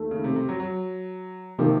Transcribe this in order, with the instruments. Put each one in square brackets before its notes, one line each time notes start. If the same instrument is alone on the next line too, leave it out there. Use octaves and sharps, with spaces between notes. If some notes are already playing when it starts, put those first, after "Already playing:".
Already playing: [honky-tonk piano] D#2 D#3 A3
[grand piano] C#3
C3
C3
F#3
F#3
[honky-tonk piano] C3 D#3 A#3 [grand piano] F3